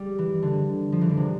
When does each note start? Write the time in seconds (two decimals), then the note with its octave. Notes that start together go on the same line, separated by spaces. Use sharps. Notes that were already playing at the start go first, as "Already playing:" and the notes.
Already playing: G3
0.19 E3
0.43 D3
0.92 F3
1.01 E3
1.09 D3
1.17 C3